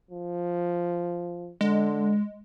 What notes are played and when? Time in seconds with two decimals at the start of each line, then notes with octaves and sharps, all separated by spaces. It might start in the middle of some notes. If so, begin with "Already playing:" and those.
0.11 F3
1.61 D3 G#3